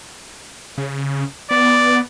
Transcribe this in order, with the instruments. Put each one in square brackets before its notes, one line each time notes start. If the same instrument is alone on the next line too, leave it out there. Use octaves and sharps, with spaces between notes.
[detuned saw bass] C#3
[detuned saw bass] B3 [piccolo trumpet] D5